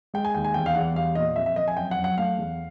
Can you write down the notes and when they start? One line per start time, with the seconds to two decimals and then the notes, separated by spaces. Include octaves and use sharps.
0.14 G#3 G5
0.25 G#5
0.35 D#2 G5
0.44 G#5
0.54 E2 G5
0.66 F5
0.75 E2 F#5
0.95 G3 F5
1.15 A#2 D#5
1.36 F2 E5
1.46 E5
1.56 F2 D#5
1.68 G#5
1.77 F#2 G5
1.91 F#5
1.98 F#2
2.04 F#5
2.18 A3 F5
2.38 E2